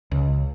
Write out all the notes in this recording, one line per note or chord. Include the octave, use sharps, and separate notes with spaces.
C#2